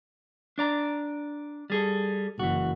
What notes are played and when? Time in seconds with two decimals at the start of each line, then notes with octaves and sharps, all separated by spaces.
0.58 D4 D5 A#5
1.70 G3 G#4 A4
2.39 F#1 E3 F#4